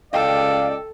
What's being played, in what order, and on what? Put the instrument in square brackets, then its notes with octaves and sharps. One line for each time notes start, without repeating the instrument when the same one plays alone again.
[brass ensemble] C#2 D5 [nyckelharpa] A4 [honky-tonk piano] D#5 G5 [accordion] F5